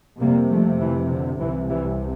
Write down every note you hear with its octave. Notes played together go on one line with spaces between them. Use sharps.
F2 C3 G3 A#3
F3 A3
E3
D3
C2 C3 E3
E3 G3